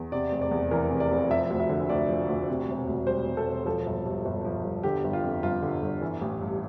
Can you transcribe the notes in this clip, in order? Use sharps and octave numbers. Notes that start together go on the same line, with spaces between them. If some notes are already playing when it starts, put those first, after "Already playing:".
Already playing: E2
C3 D5
F1
D5
E2
E3 A#4
C3
D5
F1
F3 E5
D2
E5
D3
D2 D5
F3
D2
C3
E1
D2
G3 C5
C3
A4
E1
F3 A4
G1
G2
G1
F3
G1
D3 G4
G1
F4
F2
G1 F4
D3
G1
E3
A1
G2